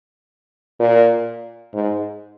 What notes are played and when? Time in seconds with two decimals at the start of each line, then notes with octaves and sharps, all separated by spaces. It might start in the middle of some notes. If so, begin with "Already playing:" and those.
0.80 A#2
1.74 G#2